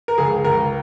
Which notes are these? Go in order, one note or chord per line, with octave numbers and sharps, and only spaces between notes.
A#4
C#2 G#4
C#2 A#4